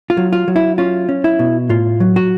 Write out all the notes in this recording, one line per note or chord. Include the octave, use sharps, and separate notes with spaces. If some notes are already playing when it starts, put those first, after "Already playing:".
F4
F#3
F4
F#3
E4
C#4 F4
C#4
E4
B2
A2 F4
F#3
F#4